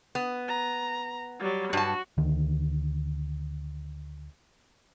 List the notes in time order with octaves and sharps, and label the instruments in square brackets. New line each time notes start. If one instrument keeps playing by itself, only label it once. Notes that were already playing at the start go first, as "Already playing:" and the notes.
[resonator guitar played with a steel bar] B3
[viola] A#5
F#3 G3
[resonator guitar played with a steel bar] G2 A5 [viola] F#4
[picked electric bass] D2 D#3